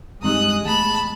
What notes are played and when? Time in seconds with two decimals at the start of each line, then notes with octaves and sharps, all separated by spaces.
0.23 G2 E3 G#3 C4 D#4 G4 D#6 F#6
0.65 E2 A3 A5 B5